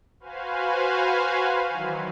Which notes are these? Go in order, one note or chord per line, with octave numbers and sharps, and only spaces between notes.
F#4 B4 C5 F5 G#5
D#3 E3 F#3